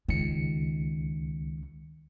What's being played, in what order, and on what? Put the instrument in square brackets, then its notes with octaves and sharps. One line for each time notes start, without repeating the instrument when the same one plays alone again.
[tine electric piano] C#2 C#7 [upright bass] D#3